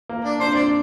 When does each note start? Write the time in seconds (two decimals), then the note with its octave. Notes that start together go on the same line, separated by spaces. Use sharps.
0.09 A#3
0.24 D4
0.40 D4 C5
0.46 C4
0.54 D4 D5